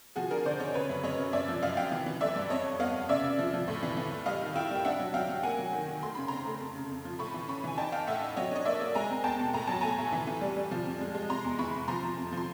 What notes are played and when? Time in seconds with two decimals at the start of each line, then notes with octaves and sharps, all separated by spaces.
0.16 F3 F#4 G#4
0.31 D3 G#4 A#4
0.45 D3 C5 D5
0.60 D3 C#5 D#5
0.74 C#3 B4 C#5
0.89 F#2
1.03 F#2 C#5 D#5
1.18 C#3
1.33 F#2 D5 E5
1.48 F3
1.63 F#2 D#5 F5
1.77 F#2 F5 G5
1.92 E3
2.06 E3
2.21 A3 D5 E5
2.36 G2
2.50 F2 C#5 D#5
2.66 F2
2.80 B3 D#5 F5
2.94 B3
3.09 C#3 D5 E5
3.24 C#3
3.39 F3
3.54 F3
3.68 A2
3.83 E3
3.97 E3
4.12 A2
4.26 G3 D#5 F5
4.41 D#3
4.56 E4 F5 G5
4.71 G3 G5
4.85 D4 E5 F#5
5.00 F#3
5.14 F#3 F5 G5
5.29 F#3
5.43 A#3 F#5 G#5
5.58 F#3
5.73 D#3
5.88 D#3
6.02 A3 C6
6.15 C#3 B5
6.28 C4 A#5 C6
6.46 A3
6.60 F2
6.75 C#3
6.90 F2
7.05 F3
7.19 A2 B5 C#6
7.34 E3
7.48 C#4 B5 C#6
7.64 E3 G#5
7.78 D#4 G5 A5
7.92 D#4 F5 G5
8.07 A2 E5 F#5
8.23 D#4
8.36 F#3 C#5 D#5
8.51 D4 D#5
8.65 A#3 D5 E5
8.81 A#3
8.95 G#3 G#5 A#5
9.10 C4
9.24 E2 G5 A5
9.39 B2
9.53 A2 A#5
9.67 F#3 A5
9.81 A3 G#5 A#5
9.98 A2
10.12 E3
10.27 E3
10.41 G3
10.57 G3
10.71 F3
10.85 F2
11.01 G#3
11.15 G#3
11.29 C3 A#5 C6
11.44 E2
11.59 E3 B5 C#6
11.73 C3
11.88 F3 A#5 C6
12.03 F3
12.17 F2
12.33 F3 C6